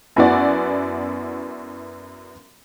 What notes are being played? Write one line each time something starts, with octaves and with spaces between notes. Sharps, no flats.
F#2 B3 E4 F#4 D5